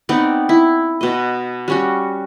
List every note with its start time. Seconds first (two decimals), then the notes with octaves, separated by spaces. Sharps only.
0.09 B3 C4 D#4 D5
0.49 E4
1.01 B2 D#5
1.68 G3 C#4 F#4